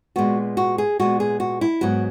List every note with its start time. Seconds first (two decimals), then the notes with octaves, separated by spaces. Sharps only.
0.16 A#2 G#3 B3 F#4
0.57 F#4
0.78 G#4
1.00 A#2 G#3 B3 F#4
1.20 G#4
1.40 F#4
1.61 E4
1.81 G#2 F#3 B3 F#4